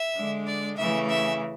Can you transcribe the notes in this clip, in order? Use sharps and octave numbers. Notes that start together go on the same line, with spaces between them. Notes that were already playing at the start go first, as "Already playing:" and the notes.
Already playing: E5
D3 G#3 D4
D5
C#3 E3 A3 C#4 E5
E5